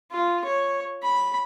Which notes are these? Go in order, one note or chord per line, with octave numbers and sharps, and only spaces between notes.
F4
C#5
B5